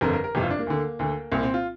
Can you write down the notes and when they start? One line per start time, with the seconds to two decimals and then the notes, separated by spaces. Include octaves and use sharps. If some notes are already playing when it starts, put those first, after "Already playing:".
0.01 G1 F2 D3 A#4
0.13 A#4
0.24 A#4
0.35 G1 F2 C3 G4
0.42 F4
0.51 D4
0.59 A#3
0.67 D2 D3
0.99 D2 D3
1.32 C2 A#2 C4
1.43 C4
1.54 F4